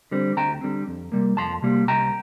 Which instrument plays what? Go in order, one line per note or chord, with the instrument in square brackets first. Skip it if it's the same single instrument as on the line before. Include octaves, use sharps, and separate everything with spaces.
[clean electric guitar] D3 G3 C4
D2 G5 A#5
D3 G3 C4
F2
C3 G3 A#3
F2 A5 C6
C3 G3 A#3
C2 G5 A#5